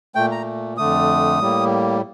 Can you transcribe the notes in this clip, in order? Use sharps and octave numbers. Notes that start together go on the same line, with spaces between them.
A#2 A3 G5
A#5
F2 D3 A3 D#6
A2 G3 A#3